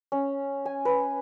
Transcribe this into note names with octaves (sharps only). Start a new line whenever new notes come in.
C#4
G#5
B4